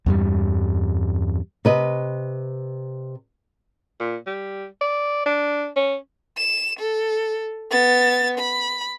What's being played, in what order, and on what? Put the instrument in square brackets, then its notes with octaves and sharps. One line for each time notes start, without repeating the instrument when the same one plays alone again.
[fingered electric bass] E2 G2 G3
[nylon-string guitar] C3 B4 D#5
[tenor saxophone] A#2
G3
D5
D4
C#4
[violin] E7
A4
B3 A6
B5